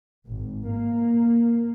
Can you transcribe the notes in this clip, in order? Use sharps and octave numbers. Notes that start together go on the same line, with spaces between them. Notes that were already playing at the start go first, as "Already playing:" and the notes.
G#1
A#3